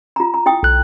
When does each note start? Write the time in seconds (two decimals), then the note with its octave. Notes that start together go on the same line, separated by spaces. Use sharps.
0.16 F4 A#5
0.34 A#5
0.46 E4 G5 D#6
0.63 B1 F#6